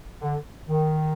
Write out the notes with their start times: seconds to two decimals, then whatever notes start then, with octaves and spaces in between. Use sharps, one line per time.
0.22 D3
0.68 D#3